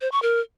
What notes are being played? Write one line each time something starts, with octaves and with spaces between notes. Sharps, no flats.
C5
C#6
A#4